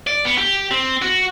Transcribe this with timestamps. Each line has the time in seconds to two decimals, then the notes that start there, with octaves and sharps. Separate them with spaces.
0.07 D5
0.25 B3
0.38 G4
0.71 C4
1.02 F#4